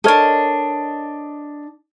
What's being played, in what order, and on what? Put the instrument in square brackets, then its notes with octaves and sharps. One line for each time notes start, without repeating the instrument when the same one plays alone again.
[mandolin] D4 D#5 [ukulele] A4 A#4 C#5